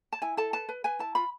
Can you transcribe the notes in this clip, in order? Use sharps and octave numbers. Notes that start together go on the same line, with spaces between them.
A5
E4 G#5
A4 A5
B4 A5
B4
B4 G#5
E4 A5
F4 B5